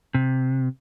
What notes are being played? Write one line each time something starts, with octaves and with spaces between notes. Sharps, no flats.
C3